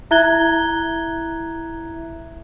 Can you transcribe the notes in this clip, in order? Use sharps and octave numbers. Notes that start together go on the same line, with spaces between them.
E4 E5 A#5 F#6 G#6 G7